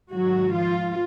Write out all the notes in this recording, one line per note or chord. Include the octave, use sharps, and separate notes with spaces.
G#2 D#3 F#3 F#4
F3 F4